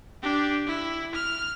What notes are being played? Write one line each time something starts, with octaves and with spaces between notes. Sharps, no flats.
D4 G4
E4
F6